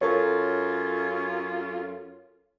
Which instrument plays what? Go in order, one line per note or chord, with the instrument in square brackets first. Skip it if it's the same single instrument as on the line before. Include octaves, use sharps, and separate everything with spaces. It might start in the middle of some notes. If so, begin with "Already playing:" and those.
[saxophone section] F#2 F4 [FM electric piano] A4 A#4 C#5